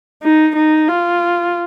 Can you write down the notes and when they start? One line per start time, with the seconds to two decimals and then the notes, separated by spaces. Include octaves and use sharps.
0.23 D#4
0.56 D#4
0.88 F4